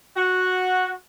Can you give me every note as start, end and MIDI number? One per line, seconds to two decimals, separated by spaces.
0.17 0.91 66